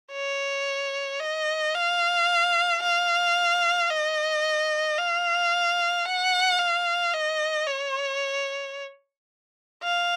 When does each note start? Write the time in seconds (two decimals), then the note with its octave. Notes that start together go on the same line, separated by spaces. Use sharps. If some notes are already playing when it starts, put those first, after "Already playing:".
0.12 C#5
1.20 D#5
1.74 F5
2.82 F5
3.91 D#5
4.98 F5
6.06 F#5
6.59 F5
7.14 D#5
7.67 C#5
9.83 F5